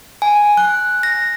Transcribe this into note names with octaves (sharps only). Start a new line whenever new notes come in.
G#5
F#6
A#6